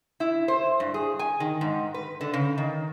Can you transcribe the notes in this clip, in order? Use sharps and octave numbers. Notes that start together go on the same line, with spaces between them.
E4
C5
G2
G#4
G#5
D#3
G#2
B4
D3
C#3
D#3